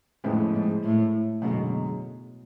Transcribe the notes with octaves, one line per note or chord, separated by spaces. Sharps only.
F2 A2 C#3 F3 G#3 B3
G#2
A2
F#2 B2 D3 G#3